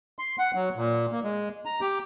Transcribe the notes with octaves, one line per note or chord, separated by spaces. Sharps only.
C6
F#5
F#3
A#2
A#3
G#3
A#5
G4